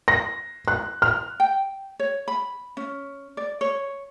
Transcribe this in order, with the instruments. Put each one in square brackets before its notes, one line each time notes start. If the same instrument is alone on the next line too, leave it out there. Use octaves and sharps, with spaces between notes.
[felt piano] A#6
F#6
F6
[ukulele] G5
C#5
B5
C#4
D5
C#5